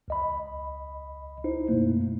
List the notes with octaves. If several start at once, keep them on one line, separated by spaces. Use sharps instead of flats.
C#2 D#5 B5
D#4 E4 C5
F#2 B2 A3 A#3